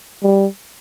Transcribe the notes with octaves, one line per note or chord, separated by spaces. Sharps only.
G3